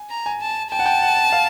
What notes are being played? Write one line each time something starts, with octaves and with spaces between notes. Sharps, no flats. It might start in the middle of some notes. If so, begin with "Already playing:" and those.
Already playing: G#5
A#5
G#5
A5
G5 A5
F#5
G5
F#5
F5